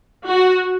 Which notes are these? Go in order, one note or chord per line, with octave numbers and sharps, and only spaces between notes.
F#4